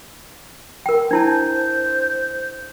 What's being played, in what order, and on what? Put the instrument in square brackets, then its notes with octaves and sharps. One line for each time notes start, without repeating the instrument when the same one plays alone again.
[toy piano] A#4 G5
[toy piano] D4 E4 A5 [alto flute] C5